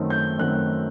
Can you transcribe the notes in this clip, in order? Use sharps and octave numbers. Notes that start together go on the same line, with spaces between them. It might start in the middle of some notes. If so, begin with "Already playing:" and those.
Already playing: F#2 D#3 A3 C4
G6
F#2 D#3 A3 C4 F#6